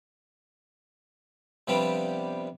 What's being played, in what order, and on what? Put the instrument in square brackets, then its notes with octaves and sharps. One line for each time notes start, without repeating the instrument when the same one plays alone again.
[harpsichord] C3 F3 G3 B3 D4